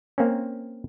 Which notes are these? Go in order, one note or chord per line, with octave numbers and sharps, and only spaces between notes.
A#3 C4 C#4